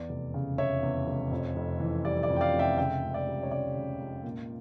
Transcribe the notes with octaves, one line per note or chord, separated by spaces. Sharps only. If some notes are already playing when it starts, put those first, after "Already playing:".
Already playing: E2 D5
F1
C#3
F1 C#5 E5
E2
F1
F2
F1
E3
G3 D5
D5
F2
G5
D5 F5
F1
E5 G5
C#3 E5 G5
C#2
D5
G3
C#5
C#2 D5
C#3
C#2
A#2